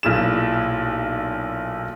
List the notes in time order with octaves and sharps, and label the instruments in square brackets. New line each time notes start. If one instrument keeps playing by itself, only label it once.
[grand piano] B1 A#2 E4 G#4 E7